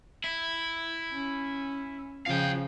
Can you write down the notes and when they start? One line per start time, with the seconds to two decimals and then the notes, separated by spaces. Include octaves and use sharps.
0.24 E4
1.13 C#4
2.26 C#3 F3 F5 G5